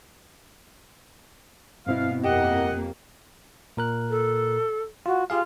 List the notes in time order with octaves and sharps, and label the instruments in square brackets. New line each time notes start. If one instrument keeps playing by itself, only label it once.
[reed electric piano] G2 C4 E4 [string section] B2 [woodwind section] F5
[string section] F2 A#3 [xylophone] G4 G5 [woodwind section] D#5 F#5
[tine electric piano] A#2 A#4 F#6
[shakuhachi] A4
[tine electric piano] F4 [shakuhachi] F#4
[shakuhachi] F4 [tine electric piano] G4 G#4 F5